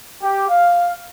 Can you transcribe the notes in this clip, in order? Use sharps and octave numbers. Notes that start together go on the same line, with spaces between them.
G4
F5